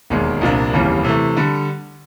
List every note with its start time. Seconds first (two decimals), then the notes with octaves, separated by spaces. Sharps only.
0.10 E1 D#2 D#3 G#3
0.41 C2 A#2 F3 A#3 D4
0.73 F1 D#2 C#3 E3 G3
1.04 C3 E3 A3
1.37 D3 G3